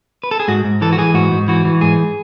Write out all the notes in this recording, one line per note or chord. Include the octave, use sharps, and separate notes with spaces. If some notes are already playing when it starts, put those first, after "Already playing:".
B4
A4
G#4
G#2 F#4
G#2
E3 A4
F#4
E3 G#4
G#2 F#4
G#2
E3 F#4
E3
G#2 G#4